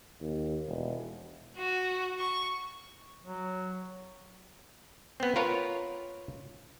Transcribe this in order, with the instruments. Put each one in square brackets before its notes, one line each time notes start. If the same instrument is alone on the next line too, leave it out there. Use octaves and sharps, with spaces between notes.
[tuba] D#2
E1
[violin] F#4
C#6
[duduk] F#3
[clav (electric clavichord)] B3 C4
F4 A#4 B4 C#5